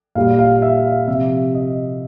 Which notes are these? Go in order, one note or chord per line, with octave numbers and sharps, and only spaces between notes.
A#2 G3 F5
F5
E5
F5
C3 F3 E5
D#5